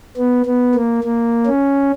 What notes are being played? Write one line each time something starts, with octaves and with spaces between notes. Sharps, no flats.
B3
B3
A#3
A#3
C#4